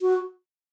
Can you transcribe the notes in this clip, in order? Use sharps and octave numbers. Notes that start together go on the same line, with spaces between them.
F#4